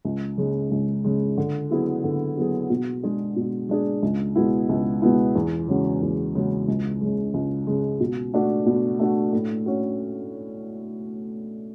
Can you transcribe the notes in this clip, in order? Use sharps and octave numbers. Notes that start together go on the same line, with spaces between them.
C#2
C#3 G#3
C#2
C#3 G#3
D3
F#3 B3 E4 G#4
D3
F#3 B3 E4 G#4
B2
G#3 D4 G#4
B2
G#3 D4 G#4
C#2
B2 G#3 B3 E4
C#2
B2 G#3 B3 E4
E2
C#3 G#3 C#4 F#4
E2
C#3 G#3 C#4 F#4
C#2
C#3 G#3
C#2
C#3 G#3
B2
A3 D4 F#4
B2
A3 D4 F#4
A2
C#4 F#4